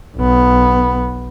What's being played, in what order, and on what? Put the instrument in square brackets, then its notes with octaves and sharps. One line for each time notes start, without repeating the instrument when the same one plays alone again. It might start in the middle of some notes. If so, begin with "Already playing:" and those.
[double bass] B1 B3